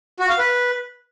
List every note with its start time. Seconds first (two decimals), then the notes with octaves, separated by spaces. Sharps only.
0.20 F#4
0.29 F5
0.38 B4